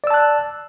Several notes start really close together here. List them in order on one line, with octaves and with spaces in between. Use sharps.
D5 E6 A5 F#6